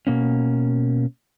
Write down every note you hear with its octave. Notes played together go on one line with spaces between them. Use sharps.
B2 A#3 C#4